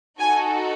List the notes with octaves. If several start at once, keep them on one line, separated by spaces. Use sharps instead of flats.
D#4 F#4 A4 G#5